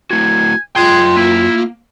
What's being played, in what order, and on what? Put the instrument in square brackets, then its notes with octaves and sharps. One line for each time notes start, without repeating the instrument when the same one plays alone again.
[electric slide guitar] A3 E4 F#4 [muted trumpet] G#5
[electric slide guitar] F#2 G5 [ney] F4 [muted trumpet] G#4 [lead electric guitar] D#5 C6
[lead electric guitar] A#3 [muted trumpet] E4